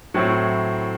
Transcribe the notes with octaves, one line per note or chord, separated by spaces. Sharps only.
A2 F#3 C4 E4